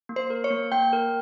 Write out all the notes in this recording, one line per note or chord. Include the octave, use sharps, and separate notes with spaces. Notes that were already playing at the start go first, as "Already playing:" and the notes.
A#3
C5
A#4
C#5
A#3
A#3 G5
A#4